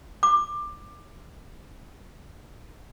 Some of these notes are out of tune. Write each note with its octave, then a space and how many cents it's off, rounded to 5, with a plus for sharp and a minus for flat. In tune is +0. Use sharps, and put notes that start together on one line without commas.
D6 +20